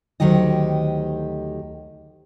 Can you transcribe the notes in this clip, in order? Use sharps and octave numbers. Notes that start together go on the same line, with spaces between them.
D2 D#3 F#3 G4 D#5